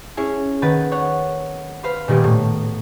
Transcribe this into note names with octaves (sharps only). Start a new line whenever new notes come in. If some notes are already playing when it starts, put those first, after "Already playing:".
C#4 E4 G#4
D#3 A#3 B4 F#5 A6
C#5 F#5
B4 C5 F5 B5
A#2 D#3 G3 A#3 B3
A2